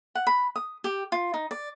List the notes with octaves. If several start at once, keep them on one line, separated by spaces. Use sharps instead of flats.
F#5
B5
D#6
G4
F4
D#4
D5